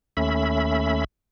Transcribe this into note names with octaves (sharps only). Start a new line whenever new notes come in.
D#2 A3 C#4 E5 B5